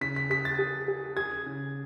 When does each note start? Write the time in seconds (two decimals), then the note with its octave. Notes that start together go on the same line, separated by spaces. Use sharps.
0.01 C#3 B6
0.16 B6
0.30 G#4 B6
0.45 A6
0.59 G#4
0.88 G#4
1.17 G#4 G#6
1.46 C#3